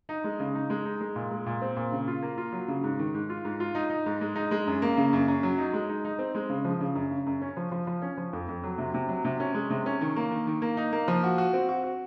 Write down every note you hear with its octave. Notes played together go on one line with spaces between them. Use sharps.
D#4
G#3
C#3
D#4
G#3
D#4
G#3
A#2
G#3
A#2
C4
A#2
C#3
F4
A#3
F4
F#3
C#3
G#2
D#3
G#2
F4
G#2
F4
D#4
D#4
G#2
G#3
D#4
G#3
F#2
A#3
C#3
F#2
F#2
F#3
D#4
G#3
D#4
D#4
C4
G#3
C#3
F3
C#3
F#2
C#3
F#2
C#4
F3
F3
F3
C#4
F3
F2
F2
F#3
C3
C3
F#3
C3
C#4
G#3
C3
C#4
D#3
A#3
D#3
D#3
A#3
D#4
A#3
F3
F#4
F#4
C4
F#4
F#4